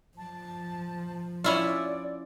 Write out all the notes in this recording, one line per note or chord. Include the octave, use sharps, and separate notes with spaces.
F3 A5
C#4 E4 F4 D5